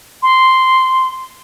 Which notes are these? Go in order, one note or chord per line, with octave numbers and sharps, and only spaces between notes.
C6